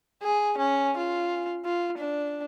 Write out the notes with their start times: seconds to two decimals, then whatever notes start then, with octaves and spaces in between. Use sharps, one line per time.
0.23 G#4
0.58 C#4
0.97 F4
1.65 F4
1.98 D4